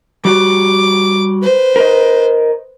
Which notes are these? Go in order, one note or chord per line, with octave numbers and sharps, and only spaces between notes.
G3 F#4 D6
B4 C5
A#4 D#5